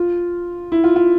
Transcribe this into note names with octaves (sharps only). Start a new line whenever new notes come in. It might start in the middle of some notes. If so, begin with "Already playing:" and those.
Already playing: F4
E4
F4
F4